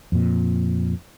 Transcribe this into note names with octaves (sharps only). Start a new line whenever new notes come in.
F2 A#2